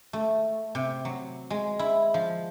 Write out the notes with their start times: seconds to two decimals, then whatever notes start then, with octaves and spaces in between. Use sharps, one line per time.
0.13 A3
0.75 C3
1.05 F#3
1.50 G#3
1.79 E4
2.14 F3